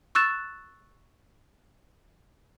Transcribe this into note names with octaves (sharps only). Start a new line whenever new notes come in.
C#6 E6 F#6 A6 E7